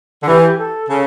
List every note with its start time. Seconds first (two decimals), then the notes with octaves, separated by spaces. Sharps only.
0.23 D3
0.28 E3 G4
0.43 G4
0.58 A4
0.89 C#3